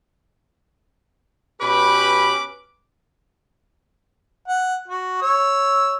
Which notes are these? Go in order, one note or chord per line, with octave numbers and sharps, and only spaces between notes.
B2 C#4 G4 B4 B5 D6
F#5
F#4
C#5 E6